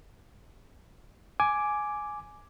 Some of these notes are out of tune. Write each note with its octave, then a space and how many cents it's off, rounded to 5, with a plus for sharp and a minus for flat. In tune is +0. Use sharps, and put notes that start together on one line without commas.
G#5 +10 D6 +0